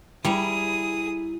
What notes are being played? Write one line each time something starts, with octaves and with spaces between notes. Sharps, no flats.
G3 E4 G#4 A#5 D#6